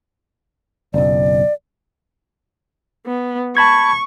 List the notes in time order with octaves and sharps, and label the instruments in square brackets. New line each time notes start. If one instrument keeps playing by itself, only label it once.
[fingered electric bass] F#1 B1 [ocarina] D5
[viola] B3
[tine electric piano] A5 B5 G#6 [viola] C#6